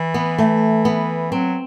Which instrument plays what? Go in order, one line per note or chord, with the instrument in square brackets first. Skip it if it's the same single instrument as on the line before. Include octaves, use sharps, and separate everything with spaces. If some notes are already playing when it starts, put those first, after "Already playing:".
Already playing: [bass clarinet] E3
[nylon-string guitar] B3
A3
B3
[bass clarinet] F#3 [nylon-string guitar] C4